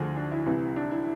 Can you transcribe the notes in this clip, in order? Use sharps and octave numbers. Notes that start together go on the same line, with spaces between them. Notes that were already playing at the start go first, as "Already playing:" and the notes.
Already playing: D2 D3 F3 G#4
D4
E4
C2 C3 E3
D4
E4